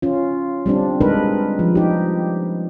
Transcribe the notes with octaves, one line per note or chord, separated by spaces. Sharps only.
C#4 F4
G3 C4 D4
G#3 D4 D#4 A#4 B4
F3
D#4 G4